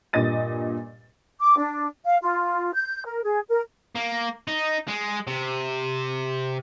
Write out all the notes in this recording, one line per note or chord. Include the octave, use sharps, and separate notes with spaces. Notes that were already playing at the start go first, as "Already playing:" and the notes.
G2 A#2 D#5 A6 D#7
D6
D4
F5
F4
G6
A#4
G#4
A#4
A#3
D#4
G#3
C3